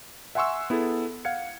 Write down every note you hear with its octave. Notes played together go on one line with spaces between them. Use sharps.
E5 F#5 G#5 C6 C#6 E6
B3 E4 G#4 A4
F5 F#5 G#6 C#7